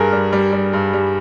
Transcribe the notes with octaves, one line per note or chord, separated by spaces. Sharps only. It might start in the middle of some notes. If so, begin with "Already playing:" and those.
Already playing: G2 G#4 A#4
G3
G3
G3
G2
G3